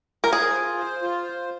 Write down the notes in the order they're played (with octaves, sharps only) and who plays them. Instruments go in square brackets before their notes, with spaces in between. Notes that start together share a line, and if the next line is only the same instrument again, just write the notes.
[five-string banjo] A#4
[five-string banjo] G#4 [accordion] C5
[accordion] F4
C5
F4
C5